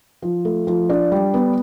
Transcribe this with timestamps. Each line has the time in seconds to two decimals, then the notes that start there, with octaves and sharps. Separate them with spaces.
0.22 F3
0.45 A3
0.67 F3
0.90 D4
1.12 G3
1.34 B3